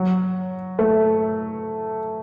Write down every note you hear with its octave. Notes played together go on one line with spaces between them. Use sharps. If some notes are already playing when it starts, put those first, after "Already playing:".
Already playing: F#3
A3